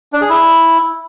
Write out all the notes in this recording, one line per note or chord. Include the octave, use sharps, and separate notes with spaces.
D4
G#4
E4